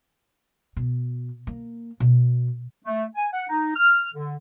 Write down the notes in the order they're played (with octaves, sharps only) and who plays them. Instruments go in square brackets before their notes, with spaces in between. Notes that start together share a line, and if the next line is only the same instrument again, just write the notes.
[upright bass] B2
A#3
B2
[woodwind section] A3
G#5
F#5
D#4
F6
D3